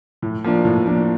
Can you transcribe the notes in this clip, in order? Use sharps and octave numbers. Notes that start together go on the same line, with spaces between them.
A2
F3 A#3 D4
A2
F3 A#3 D4